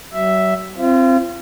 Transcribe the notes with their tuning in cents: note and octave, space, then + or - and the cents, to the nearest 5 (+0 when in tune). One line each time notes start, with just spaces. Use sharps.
F#3 +40 E5 +0
C4 +0 F4 -35